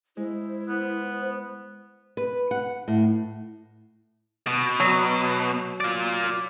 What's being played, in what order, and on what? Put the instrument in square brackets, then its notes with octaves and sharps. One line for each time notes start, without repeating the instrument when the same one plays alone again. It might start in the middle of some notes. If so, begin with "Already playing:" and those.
[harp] G#3 [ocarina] E4 [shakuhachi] C5
[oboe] B3 [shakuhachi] C5
[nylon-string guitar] B4
F#5
A2
[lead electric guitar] B2
[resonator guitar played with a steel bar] F#3
[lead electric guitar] F4 D5